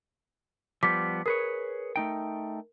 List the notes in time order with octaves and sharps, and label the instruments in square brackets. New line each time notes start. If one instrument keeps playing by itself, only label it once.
[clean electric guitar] F3 G3 B3 [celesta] D6 B6
[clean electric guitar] G#4 B4 C#5 [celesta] A#4
[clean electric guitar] A3 D#4 G5